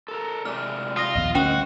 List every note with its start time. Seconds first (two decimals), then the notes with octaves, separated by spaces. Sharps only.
0.08 A4 A#4
0.45 C3 G#3 D5 F6
0.97 F4 D#6 A#6
1.15 A#1 D#2 B3 D#5
1.35 D2 G3 C#4 F#4 G5